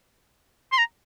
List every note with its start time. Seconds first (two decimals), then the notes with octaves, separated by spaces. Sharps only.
0.72 C6
0.78 A#5